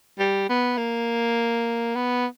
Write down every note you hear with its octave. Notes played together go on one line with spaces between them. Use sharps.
G3
B3
A#3
B3